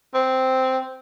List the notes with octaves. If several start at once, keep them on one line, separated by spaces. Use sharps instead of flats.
C4